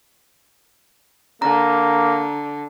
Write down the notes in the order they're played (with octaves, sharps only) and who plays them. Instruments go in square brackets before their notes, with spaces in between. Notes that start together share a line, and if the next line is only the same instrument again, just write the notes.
[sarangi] D3 [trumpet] A#3 [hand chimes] A#5